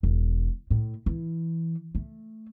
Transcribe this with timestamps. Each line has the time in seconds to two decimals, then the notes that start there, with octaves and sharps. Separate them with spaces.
0.03 E1
0.71 A2
1.06 E3
1.95 A3